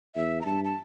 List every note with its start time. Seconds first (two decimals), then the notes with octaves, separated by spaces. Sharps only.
0.15 E2 E5
0.41 A#5
0.45 G2 A5
0.64 A5